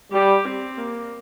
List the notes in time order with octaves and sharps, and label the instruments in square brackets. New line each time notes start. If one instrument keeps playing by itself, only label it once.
[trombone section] G3 [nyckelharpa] G4
[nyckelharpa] C4
A#3